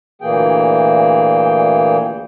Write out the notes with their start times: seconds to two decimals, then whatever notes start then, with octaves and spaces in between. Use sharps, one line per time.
0.22 D2 A#2 E3 A#3 G#4 G5